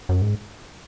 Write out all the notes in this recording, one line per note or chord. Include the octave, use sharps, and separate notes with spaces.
F#2
G#2